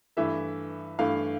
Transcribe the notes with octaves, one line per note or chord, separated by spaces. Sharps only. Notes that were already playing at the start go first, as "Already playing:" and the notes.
G2 E3 A3 E5
G2 E3 A3 F5